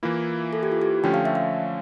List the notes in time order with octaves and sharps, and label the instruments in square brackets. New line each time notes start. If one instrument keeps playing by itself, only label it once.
[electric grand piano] E3 A#3 E4 [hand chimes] F4
[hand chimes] A4
G4
F4
G4
[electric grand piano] D3 F3 A3 C#4 [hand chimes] G5
[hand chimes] F5
E5
F5